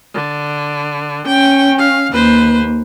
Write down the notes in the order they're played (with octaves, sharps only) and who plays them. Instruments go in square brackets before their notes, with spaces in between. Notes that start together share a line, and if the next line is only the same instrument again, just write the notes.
[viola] D3
[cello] C#4 [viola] G5
[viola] F5
[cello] D#2 [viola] B4 C5